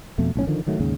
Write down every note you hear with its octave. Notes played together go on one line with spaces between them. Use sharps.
F2 B2 A3
B1 A2 C#4
D3 D#3 F3
A1 D#3 F#3 A3
D#2 G#2 C#3